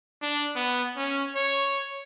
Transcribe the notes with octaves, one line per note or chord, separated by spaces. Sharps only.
D4
B3
C#4
C#5